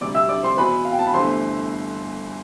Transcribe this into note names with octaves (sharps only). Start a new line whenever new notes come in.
D2 C3 G3 D5 D6
E5 E6
D5 D6
C5 C6
E2 B2 B3 B4 B5
F5
G5
A5
B5
G1 G2 E3 A3 C5 C6